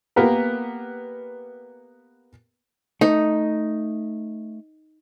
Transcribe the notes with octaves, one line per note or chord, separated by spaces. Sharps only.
A#3 B3 G4 A#4 B4
A3 D#4